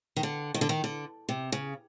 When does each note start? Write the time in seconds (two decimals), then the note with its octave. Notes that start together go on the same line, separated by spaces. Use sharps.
0.16 D#3
0.23 D3
0.54 D#3
0.61 D3
0.69 D#3
0.84 D3
1.29 C3
1.52 C#3